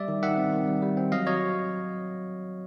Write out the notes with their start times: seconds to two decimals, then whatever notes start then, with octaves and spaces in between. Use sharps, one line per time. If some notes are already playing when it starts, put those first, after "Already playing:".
Already playing: G3 D5 E5
0.08 D#3
0.23 D#3 E5 F#5
0.37 C4
0.52 D#3
0.67 G3
0.82 G3
0.97 C4
1.12 F#3 D#5 F5
1.27 F#3 C#5 D#5